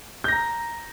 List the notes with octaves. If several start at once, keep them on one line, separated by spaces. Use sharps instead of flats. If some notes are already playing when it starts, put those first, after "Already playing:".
A#5 G6 A#6